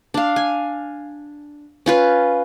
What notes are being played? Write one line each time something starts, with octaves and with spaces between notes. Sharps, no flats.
D4 F5
G#5
C#4 F4 B4